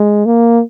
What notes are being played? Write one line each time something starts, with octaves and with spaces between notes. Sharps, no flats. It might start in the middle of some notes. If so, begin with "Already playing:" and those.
Already playing: G#3
A#3